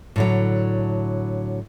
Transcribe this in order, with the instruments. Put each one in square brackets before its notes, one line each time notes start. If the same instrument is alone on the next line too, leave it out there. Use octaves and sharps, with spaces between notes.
[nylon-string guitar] A2 D3 F#3